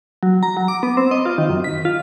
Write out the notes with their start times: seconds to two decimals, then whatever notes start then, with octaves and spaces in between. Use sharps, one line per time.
0.23 F#3
0.43 A#5
0.57 F#3
0.68 D6
0.83 B3
0.97 C4
1.11 D#5
1.26 F4
1.38 D#3
1.50 F#2
1.64 B6
1.85 F4